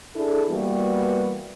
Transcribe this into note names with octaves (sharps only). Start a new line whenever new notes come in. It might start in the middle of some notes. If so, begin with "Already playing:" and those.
D4 E4 G#4 A4
E3 G3 A#3 B3 F#4 B4